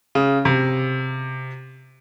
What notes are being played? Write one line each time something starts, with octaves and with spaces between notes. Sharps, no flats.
C#3
C3